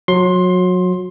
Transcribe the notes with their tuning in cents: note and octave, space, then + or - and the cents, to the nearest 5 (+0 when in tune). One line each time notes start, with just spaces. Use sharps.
F#3 -25 C6 +15